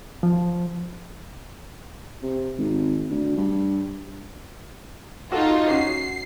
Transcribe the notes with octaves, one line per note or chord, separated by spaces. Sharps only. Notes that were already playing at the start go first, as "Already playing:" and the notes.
F3
C3
G#1
D2
G2
D#4 F4 F#4 A4
C#4 F#4 C7